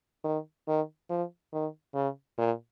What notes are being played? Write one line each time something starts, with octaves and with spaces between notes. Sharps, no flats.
D#3
D#3
F3
D#3
C#3
A#2